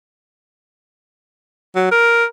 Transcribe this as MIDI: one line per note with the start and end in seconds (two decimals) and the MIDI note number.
1.76 1.88 54
1.92 2.25 70